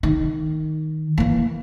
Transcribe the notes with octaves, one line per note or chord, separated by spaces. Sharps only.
D#3
E3 A#3